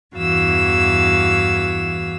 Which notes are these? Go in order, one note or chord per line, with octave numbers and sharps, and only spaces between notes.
E2 G2 E3 F#4 F5 E6